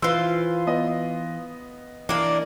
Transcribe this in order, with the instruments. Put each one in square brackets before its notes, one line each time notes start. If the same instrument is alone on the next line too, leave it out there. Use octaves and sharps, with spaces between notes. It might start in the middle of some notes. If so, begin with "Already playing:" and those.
[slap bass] E3 [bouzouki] F4 C5 [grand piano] B4 E6
[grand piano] B3 D#5
[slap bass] E3 [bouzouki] A#3 D4